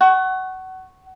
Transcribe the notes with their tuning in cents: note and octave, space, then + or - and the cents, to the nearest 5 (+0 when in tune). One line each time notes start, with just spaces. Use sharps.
F#5 +25 C#6 -10